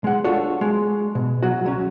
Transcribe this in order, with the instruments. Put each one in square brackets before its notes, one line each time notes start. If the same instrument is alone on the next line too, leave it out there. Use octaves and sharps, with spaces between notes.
[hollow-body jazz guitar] G#3 F#5
D4 F4 F#4 A4 C#5
G#3
B2
F#3 F#4
C#2 F#3 C#4